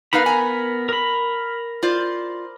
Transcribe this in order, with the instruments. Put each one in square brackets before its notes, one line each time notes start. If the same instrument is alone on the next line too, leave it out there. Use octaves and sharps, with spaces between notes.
[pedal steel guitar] B3 A#4 B5 [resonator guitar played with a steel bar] D#4 B4 F5
[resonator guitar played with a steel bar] G#5 A#5
[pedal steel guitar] A#4 B5
[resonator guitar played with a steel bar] F4 C5 D5